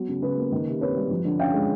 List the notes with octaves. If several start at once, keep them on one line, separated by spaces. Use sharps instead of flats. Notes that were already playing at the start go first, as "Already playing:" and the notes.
Already playing: F#3 B3
C#3
C#3 B4
A#3
D#3
C3
C4 B4 C#5
G3
F3
D3
C#4 F5 G5
G#3